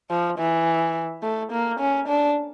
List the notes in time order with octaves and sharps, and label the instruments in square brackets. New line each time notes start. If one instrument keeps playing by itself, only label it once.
[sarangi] F3
E3
A3
A#3
C#4
D4